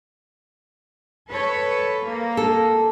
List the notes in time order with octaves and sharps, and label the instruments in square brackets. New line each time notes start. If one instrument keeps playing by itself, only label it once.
[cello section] A4 B4 C#5
A#3
[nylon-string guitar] A4